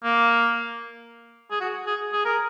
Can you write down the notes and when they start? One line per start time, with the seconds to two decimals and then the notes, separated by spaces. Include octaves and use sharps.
0.04 A#3
1.51 G#4
1.60 F#4
1.86 G#4
2.13 G#4
2.25 A#4